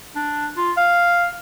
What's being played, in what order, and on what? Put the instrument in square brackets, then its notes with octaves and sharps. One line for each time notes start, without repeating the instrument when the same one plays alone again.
[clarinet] D4
F4
F5